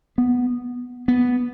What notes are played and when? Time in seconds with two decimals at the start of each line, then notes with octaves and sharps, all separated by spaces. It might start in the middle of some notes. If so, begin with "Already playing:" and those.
0.18 B3
1.08 B3